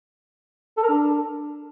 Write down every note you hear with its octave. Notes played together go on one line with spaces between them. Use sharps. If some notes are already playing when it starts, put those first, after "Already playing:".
A4
A#4
D4